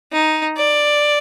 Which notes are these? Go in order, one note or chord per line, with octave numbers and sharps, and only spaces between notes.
D#4
D5